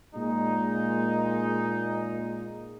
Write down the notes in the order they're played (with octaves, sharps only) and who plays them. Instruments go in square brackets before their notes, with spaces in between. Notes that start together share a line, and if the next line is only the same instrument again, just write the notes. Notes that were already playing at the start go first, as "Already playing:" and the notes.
[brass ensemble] A#2 G#3 D#4